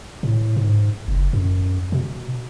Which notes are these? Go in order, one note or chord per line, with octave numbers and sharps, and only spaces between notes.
A2
G#2
F#1
F#2
B2